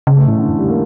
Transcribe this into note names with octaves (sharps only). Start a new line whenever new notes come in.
C#3 C#4
A3
A2 E3
D3
F2 E3
G3
A#3